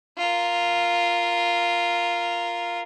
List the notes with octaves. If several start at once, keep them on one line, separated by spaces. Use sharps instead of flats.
F4 A#4